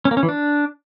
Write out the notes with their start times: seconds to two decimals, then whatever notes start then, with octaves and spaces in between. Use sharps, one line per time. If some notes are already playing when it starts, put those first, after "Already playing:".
0.05 C#4
0.11 A#3
0.17 C#4
0.23 E3
0.29 D4